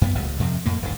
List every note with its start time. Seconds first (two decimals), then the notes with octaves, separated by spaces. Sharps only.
0.01 F#2 A3 B3
0.14 D#1 C#2 A#2 G3
0.39 F2 C3 F3 C4
0.66 F2 A2 A#3
0.82 D1 G#1 D#2 D3